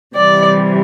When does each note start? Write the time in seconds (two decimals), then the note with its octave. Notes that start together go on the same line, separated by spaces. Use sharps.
0.15 C3 E3 G3 D5